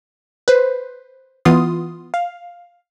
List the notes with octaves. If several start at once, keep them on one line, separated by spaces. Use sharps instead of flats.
B4 C5
E3 B3 F4 C6 D#6
F5